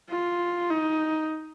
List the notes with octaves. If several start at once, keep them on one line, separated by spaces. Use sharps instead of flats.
F4
D#4